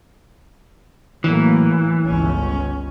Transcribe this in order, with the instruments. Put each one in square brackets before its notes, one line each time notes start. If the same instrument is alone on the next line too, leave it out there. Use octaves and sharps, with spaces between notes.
[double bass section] A2 F#3 A#3 [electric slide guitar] E3
[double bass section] G1 C#2 C#4